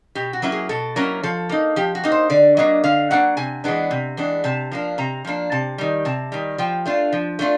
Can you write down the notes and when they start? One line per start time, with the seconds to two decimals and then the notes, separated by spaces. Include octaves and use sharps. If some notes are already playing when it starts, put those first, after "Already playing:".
0.15 B2 G4
0.33 F#4
0.42 F#3 A#3 C#4 E4
0.52 G#4
0.69 B2 A4
0.96 F#3 A#3 C#4 E4 A#4
1.23 F3 A4
1.49 A#3 D#4
1.76 F3 G4
1.95 F#4
2.04 A#3 D#4
2.12 C5
2.30 D3 D5
2.57 F#3 A#3 D4 D#5
2.84 D3 F5
3.10 F#3 A#3 D4 F#5
3.37 C3 G#5
3.64 E3 G#3 B3 D4
3.91 C3
4.17 E3 G#3 B3 D4
4.44 C3 A5
4.71 F3 A#3 D4
4.98 C3 A#5
5.24 F3 A#3 D4
5.52 C3 A5
5.78 D#3 G3
6.05 C3 A5
6.32 D#3 G3
6.58 F3 G5
6.85 A3 D4 F4
7.13 F3
7.39 A3 D4 F4